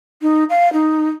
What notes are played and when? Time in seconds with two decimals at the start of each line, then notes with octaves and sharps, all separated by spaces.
0.22 D#4
0.49 F5
0.72 D#4